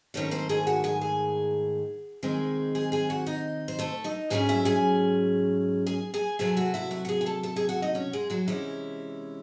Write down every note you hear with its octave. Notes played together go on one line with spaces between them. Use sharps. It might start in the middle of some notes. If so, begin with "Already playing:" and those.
G#2 D#3 A3 C4 C#4 C#5
C4 C5
G#4 G#5
F#4 F#5
G#4 G#5
G#4 G#5
C3 D#3 G#3 C4 G#4 G#5
G#4 G#5
G#4 G#5
F#4 F#5
D#4 D#5
C5
A3 A4
D#4 D#5
G#2 F#3 A3 C#4 G#4 G#5
E4 E5
G#4 G#5
G#4 G#5
G#4 G#5
C3 F#3 A3 G#4 G#5
F#4 F#5
E4 E5
F#4 F#5
F#5
G#4 G#5
G#5
A4 A5
A4 A5
G#4 G#5
F#4 F#5
D#4 D#5
C#4 C#5
G#3 G#4
F#3 F#4
C3 E3 G#3 C#4 E4